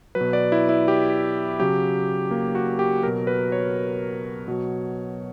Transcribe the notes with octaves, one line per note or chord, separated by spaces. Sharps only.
F#3 B4
B2
D5
E4
E4
G4
C#3 F#3 G4
A#3
F#4
G4
B2 F#3 A#4
B4
C#5
B2 F#3